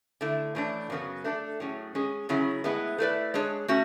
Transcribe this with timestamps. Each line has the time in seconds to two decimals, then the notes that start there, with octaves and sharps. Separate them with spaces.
0.21 D3 A3 E4
0.55 A2 E3 A3 D4
0.90 F#2 C#3 F#3 B3 F#4
1.24 A3 D4 A4
1.60 A2 F#3 C#4 G#4
1.95 G#3 C#4 G#4
2.29 C#3 F#3 C#4 E4 G#4
2.64 A2 G#3 B3 E4
2.98 A3 E4 B4 D5
3.34 G#3 D4 G#4 C#5
3.68 A3 C#4 F#4